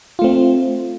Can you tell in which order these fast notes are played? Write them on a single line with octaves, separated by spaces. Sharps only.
F4 A3 C4